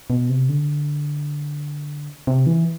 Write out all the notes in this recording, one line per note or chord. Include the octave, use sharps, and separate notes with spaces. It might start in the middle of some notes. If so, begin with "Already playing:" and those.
B2
C3
D3
C3
E3